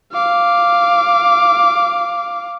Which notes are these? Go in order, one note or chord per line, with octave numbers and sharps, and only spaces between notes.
F5 D6